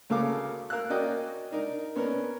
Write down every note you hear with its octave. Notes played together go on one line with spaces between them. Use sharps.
D2 C#3 A4 A#4 F5 D6
A#4 F5 E6 F#6
A#3 C#4 F#4 D5 D#5 G5
D4 D#4 A#4
B3 C#4 D4 A#4